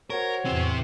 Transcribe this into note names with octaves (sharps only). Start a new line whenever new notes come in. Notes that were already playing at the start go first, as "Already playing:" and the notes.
F#4 A#4 C5 C#5
E2 A2 C3 C4